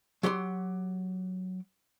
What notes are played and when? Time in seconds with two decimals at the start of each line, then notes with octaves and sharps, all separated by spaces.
0.23 F#3 G4 F#5 C6